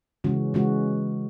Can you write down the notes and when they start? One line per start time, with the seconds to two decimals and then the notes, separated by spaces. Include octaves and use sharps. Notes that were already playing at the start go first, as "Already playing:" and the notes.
0.24 C#3 E3 G#3 C#4 F#4
0.54 C#3 E3 G#3 C#4 F#4